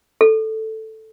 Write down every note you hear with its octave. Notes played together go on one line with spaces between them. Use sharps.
A4